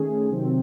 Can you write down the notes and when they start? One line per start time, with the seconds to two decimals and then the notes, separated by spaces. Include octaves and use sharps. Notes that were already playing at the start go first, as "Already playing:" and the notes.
Already playing: D#3 A3 C#4 G#4
0.29 C3 D#3 F#3 C4